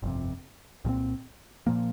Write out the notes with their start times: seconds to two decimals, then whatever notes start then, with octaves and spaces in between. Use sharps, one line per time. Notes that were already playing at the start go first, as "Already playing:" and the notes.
0.02 G1 F2 C3
0.85 C2 A#2 F3 C4
1.67 A#2 F3 A#3